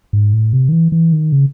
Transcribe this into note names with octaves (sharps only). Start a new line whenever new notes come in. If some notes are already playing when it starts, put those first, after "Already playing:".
G#2
A2
C3
D#3
E3
E3
D#3
C#3